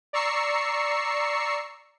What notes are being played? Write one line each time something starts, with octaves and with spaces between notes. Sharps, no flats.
D5 A#5 C#6 E6 C7 C#7